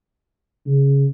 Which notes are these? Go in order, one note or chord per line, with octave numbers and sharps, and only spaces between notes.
C#3